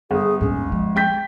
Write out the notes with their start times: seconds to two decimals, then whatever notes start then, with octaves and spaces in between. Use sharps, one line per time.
0.11 G1 G#4
0.41 D#2 G#2 C#4
0.72 F3 G#3
0.96 G5 G6 B6